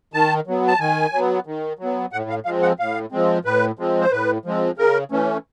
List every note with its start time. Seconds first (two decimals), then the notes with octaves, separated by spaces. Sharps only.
0.14 D#3 A5
0.47 F#3 B3
0.67 A5
0.80 D#3 G#5
1.13 F#3 B3
1.47 D#3
1.79 F#3 B3
2.13 A2 F#5
2.29 F5
2.45 F3 G#3 C4 F5
2.62 F#5
2.79 A2 F5
3.12 F3 G#3 C4
3.45 A2 B4
3.79 F3 G#3 C4
4.01 C5
4.11 A2 B4
4.45 F3 G#3 C4
4.77 C#3 A#4
5.11 E3 A3 C#4